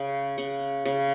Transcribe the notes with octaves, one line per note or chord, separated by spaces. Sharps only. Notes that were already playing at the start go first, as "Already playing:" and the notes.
Already playing: C#3 G5
C#3 F#5
C#3